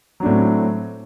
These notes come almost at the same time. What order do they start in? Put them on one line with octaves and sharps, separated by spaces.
F#3 D4 A2 C4